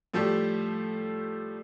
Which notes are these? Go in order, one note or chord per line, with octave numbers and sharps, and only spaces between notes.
A2 F3 G3 A3 G4